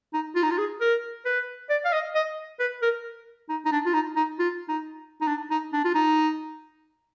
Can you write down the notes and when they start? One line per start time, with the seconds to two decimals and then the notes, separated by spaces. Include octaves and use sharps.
0.14 D#4
0.35 F4
0.43 D#4
0.51 F4
0.58 G#4
0.81 A#4
1.26 B4
1.70 D5
1.85 F5
1.93 D#5
2.15 D#5
2.59 B4
2.82 A#4
3.49 D#4
3.65 D#4
3.72 D4
3.85 F4
3.93 D#4
4.16 D#4
4.39 F4
4.69 D#4
5.21 D#4
5.28 D4
5.51 D#4
5.73 D4
5.85 F4
5.95 D#4